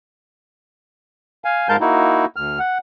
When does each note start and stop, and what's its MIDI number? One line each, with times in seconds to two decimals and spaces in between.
1.45 1.69 77
1.45 1.69 80
1.69 1.76 44
1.69 1.76 56
1.69 1.76 70
1.69 1.76 77
1.69 1.76 81
1.69 1.76 91
1.81 2.25 58
1.81 2.25 63
1.81 2.25 64
1.81 2.25 66
2.36 2.59 38
2.36 2.59 89
2.59 2.78 78